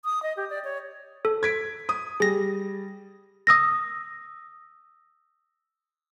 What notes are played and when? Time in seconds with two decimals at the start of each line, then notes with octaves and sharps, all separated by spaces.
0.05 D#6
0.23 D#5
0.37 G4
0.50 D5
0.64 C#5
1.25 A4
1.43 G#6 B6 D7
1.89 D#6
2.20 G3 G#4 A#6
3.47 D#6 E6 A#6